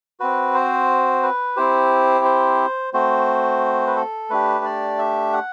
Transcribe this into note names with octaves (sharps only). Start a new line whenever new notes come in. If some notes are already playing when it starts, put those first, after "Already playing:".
C4 F#4 B4
C5
B4
C4 E4 G4 C5
C5
A3 C4 F#4 C5
B4
A4
A3 D4 G4 B4
D5
E5
F#5